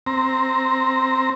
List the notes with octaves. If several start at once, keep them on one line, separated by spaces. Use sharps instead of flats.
C4 A#5